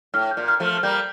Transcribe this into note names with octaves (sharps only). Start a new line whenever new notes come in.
A2 F6
G6
A#2
F6
F3 A3
F6
F6
G3 A#3 G6